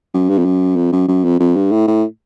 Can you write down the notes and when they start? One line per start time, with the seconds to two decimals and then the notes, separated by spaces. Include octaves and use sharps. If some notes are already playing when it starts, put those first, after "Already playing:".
0.14 F#2
0.29 G2
0.38 F2
0.45 F#2
0.76 F2
0.92 F#2
1.08 F#2
1.24 F2
1.40 F2
1.56 G2
1.71 A2
1.87 A2